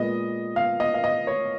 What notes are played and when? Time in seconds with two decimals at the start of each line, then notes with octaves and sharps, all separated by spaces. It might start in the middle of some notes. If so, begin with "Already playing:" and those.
Already playing: A#2 G#3 B3 D#5
0.56 F5
0.80 D#5
0.94 F5
1.04 D#5
1.27 C#5